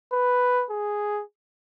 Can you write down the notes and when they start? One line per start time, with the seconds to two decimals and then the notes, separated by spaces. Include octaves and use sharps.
0.13 B4
0.70 G#4